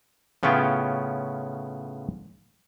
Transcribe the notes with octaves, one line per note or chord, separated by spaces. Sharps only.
A2 C#3 B3 C#4 F4 G5